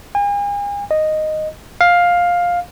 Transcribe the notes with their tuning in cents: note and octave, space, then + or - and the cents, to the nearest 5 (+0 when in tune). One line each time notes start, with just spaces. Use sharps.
G#5 -40
D#5 -5
F5 +10